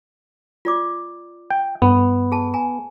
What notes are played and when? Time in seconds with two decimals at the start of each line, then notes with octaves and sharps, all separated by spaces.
0.65 F4 D5 D6
1.50 G5
1.82 G2 B3
2.32 G#4 A5
2.54 G#5 A#5